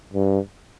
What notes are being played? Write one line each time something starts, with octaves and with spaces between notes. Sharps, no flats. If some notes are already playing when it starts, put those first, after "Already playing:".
G2